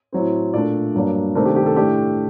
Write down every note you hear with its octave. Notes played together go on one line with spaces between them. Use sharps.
A2 F#3 C4
A#2 A3 D4 D5
G2 F#3 A#3 D4
C3 D#3 A3 D4 A#4
G4
G4
A4
A2 A3 D4 G4